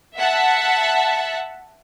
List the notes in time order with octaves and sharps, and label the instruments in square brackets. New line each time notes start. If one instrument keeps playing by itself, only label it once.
[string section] E5 F#5 A5